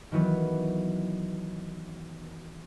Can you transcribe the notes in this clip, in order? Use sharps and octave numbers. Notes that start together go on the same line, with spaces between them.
D#3 E3 F#3 B3